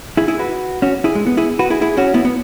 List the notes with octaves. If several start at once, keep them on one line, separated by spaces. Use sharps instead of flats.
E4 G#4
E4 G#4
F#4 B4
C#4 F#4
E4 G#4
G#3
B3
E4 G#4
F#4 B4
E4 G#4
E4 G#4
C#4 F#4
B3 E4
B3